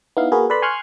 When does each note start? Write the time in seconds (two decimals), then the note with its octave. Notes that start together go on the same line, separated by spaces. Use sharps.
0.17 B3 D#4 E4 F5
0.32 A#3 F#4 G#4 A#4 B4
0.50 A4 B4 D5 A5 B5 C6
0.62 G#5 C6 C#6 F6 F#6 G#6